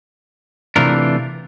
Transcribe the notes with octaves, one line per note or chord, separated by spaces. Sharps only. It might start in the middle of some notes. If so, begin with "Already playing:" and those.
C3 E3 A3 D4 F4 A#4